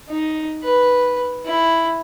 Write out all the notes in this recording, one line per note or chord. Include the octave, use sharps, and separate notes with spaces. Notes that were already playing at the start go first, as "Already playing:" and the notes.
D#4
B4
E4